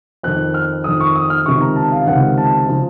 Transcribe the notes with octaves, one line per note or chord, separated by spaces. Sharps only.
F2 D#3 F#6
F6
F2 D#3 D#6
C#6
D#6
F6
C#2 C3 D#3 C#6
A#5
A5
F5
C#2 C3 D#3 F#5
A5
C#3 F3